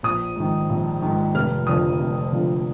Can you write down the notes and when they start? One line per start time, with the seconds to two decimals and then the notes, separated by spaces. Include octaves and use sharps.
0.03 A#1 D#6
0.36 G#2 D#3
0.70 A#1
1.02 G#2 D#3
1.35 F1 F6
1.67 F2 D3 F3 D#6
2.00 F1
2.32 F2 D3 F3